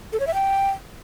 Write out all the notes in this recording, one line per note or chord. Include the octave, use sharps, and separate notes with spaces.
A4
C#5
E5
G5